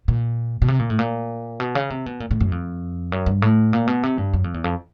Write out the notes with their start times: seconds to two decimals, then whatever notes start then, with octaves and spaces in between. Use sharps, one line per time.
0.08 A#2
0.62 B2
0.68 C3
0.79 A#2
0.90 A2
0.99 A#2
1.60 B2
1.75 C#3
1.90 C3
2.06 B2
2.20 A#2
2.31 A2
2.41 F#2
2.52 F2
3.12 F#2
3.26 G2
3.42 A2
3.73 A#2
3.87 B2
4.03 C3
4.18 G2
4.33 F#2
4.44 F2
4.54 E2
4.64 F2